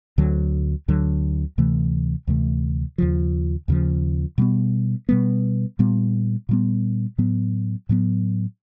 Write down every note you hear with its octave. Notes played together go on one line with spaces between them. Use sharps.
D2 D3 F#3
D2 D3 F#3
D2 C3 E3 A3
D2 C3 E3 A3
D#2 C#3 F3
D#2 C#3 F3
B2 G3 B3
B2 G3 B3
A#2 G3 B3
A#2 G3 B3
A2 F#3 B3
A2 F#3 B3